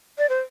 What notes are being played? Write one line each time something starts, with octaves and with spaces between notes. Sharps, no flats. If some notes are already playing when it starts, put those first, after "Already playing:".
D5
C5